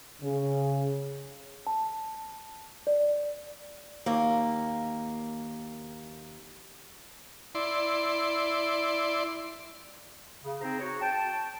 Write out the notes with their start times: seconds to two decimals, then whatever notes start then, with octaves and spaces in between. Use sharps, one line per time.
0.22 C#3
1.67 A5
2.87 D5
4.06 D#2 A#3
7.55 E4 D5 C6
10.42 C#3
10.61 C4 D#4 G#4 C5 A#5
10.80 F#4 G#4 C#5
11.01 G5 A5